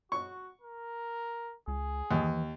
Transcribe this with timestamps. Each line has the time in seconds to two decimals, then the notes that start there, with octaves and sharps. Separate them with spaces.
0.12 F#4 C#6
0.62 A#4
1.68 C#2 G#4
2.11 D#2 E3